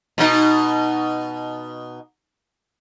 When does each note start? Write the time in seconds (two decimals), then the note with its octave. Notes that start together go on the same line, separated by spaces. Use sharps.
0.18 B2 D#4